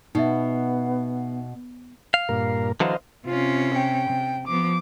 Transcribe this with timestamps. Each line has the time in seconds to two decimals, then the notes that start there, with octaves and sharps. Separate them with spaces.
0.15 B2 B3 D#4 E5
2.14 F5
2.29 G2 A#2 A#4
2.80 D3 E3 F#3 C5 D#5 F5
3.26 C3 C#4 F4
3.74 G5
4.09 C3
4.47 F3 B3 D6